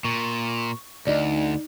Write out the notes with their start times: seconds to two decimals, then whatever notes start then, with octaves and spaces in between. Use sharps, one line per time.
0.05 A#2 C#6
1.07 D2 D#4 D5